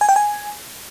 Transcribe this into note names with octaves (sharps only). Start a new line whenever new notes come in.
G#5
G5
G#5